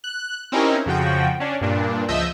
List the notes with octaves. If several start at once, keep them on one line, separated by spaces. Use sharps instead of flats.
F#6
C4 C#4 D#4 E4 G4 A#4
F2 C#3 F3 F#4 G5
C#4 D4
G2 A#2 D4
C#2 F3 D#5 E5 E6 G6